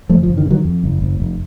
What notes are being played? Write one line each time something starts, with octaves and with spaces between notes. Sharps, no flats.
F#1 F3 A3
F3
F#1
D#3
C#3
D#3 F#3
F2
F#1
F#1
F1